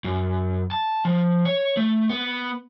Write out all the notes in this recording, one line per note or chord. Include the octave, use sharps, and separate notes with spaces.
F#2
A5
F3
C#5
A3
B3